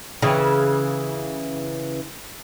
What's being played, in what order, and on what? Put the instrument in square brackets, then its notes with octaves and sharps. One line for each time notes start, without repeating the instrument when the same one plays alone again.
[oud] C#3 E3